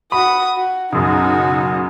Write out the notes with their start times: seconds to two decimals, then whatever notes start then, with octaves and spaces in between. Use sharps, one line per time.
0.12 F#4 B5 D#6
0.57 F#4
0.92 B1 F#2 C#3 D#4 F#4